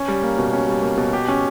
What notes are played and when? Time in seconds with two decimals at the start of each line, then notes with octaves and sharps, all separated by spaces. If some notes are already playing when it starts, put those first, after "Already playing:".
Already playing: C#4
0.08 G3
0.23 A#3
0.38 B2
0.53 C#4
0.68 G3
0.82 A#3
0.97 B2
1.13 G4
1.28 C#4